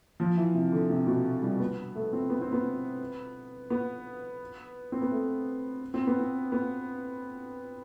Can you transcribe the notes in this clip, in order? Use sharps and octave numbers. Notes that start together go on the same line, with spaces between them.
F3
E3
C3
D3
C3
B2
G3
B3
A3
C4
B3
C4
B3
B3
C4
B3
A3
C4
B3
C4
B3